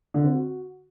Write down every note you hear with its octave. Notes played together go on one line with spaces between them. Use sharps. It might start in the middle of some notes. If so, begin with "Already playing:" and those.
D3
C4
F#4